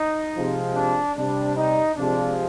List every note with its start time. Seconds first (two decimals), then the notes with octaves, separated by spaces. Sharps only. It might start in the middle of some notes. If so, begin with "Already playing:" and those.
Already playing: D#4
0.35 C3 F3 G#3
0.75 D4
1.15 C3 G3 D4
1.56 D#4
1.96 C3 F3 G#3 D4